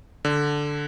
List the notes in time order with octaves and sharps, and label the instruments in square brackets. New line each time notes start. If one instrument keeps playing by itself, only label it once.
[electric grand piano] D3